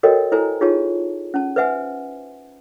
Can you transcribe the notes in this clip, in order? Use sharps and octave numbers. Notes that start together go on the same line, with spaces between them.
F#4 A4 A#4 C#5 D#5 G5
E4 A4 C5 G#5 A#5
D#4 F4 G4 G#4 C#5 A5
C#4 A5
B4 C5 E5 F#5 G#5